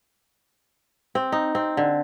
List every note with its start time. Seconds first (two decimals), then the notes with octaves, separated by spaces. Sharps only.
1.15 C4
1.32 D#4
1.55 C4
1.77 D3